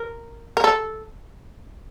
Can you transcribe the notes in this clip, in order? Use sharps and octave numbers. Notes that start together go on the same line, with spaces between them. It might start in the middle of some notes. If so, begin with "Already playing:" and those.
Already playing: A#4
A#4
A4